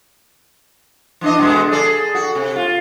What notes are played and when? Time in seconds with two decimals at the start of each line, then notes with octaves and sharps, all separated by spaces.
1.21 E3 D4 D#5
1.38 B2 D3 G#3
1.71 G#4 A4 D5
2.15 F#4
2.35 C3
2.56 F4